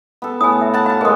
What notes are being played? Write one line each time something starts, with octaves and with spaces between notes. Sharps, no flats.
B3 A4
A2 B3 G#5 D#6
E5
F#5 A5 B5
F#4 F5 F#5
E3 G#3 G#4 A#4 D#6